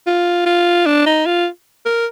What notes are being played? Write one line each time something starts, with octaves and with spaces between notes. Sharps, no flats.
F4
F4
D4
D#4
F4
A#4